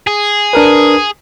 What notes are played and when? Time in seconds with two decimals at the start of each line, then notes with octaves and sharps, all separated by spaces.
0.07 G#4
0.53 D4 A#4 B4